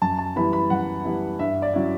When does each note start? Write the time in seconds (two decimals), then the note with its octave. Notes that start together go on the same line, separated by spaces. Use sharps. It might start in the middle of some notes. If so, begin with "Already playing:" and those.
0.02 F#2 A5
0.18 A5
0.36 E3 G3 B3 E4 B5
0.53 B5
0.70 F#2 F#5
1.05 E3 G3 B3 E4
1.39 G2 E5
1.62 D5
1.73 F#3 C#4 E4